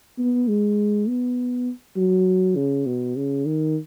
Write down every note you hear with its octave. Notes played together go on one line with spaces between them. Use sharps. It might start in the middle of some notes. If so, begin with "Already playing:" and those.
B3
G#3
B3
F#3
C#3
B2
C#3
D#3